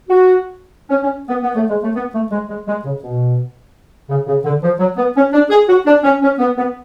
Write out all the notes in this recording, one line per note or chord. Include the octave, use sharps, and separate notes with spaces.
F#4
C#4
C#4
B3
B3
A3
G#3
A3
B3
A3
G#3
G#3
G#3
C#3
B2
C#3
C#3
D3
F3
F#3
B3
C#4
D4
G#4
F#4
D4
C#4
C#4
B3
B3